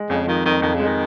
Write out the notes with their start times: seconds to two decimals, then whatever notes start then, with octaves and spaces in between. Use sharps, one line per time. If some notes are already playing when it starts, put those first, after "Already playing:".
Already playing: G#3
0.09 F2 C#3
0.27 D#3 F3
0.45 F2 D#3
0.62 F2 D#3
0.75 C#3
0.80 G#3
0.87 D#3